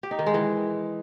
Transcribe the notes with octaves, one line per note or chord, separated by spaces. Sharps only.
G4
D#4
D#3
G#3
E3